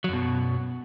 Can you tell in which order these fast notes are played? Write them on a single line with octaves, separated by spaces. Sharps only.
F#3 F#2 B2